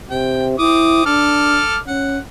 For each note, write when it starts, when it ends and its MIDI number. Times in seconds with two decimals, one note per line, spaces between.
0.10 0.58 48
0.10 0.45 79
0.59 1.04 60
0.59 1.05 64
0.59 1.04 86
0.59 1.04 87
1.06 1.61 62
1.06 1.77 69
1.06 1.77 86
1.06 1.77 89
1.88 2.18 61
1.88 2.19 78